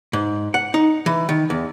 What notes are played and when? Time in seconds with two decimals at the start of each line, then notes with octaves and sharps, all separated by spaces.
0.13 G#2
0.54 F#5
0.74 D#4
1.06 E3
1.29 D#3
1.50 E2